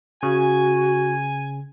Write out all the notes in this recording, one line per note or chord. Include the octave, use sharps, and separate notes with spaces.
C#3 F#4 G#5